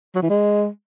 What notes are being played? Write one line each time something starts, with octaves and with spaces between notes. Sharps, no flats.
F#3
E3
G#3